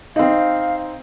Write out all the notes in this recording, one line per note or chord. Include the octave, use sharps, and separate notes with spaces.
C4 D#4 F5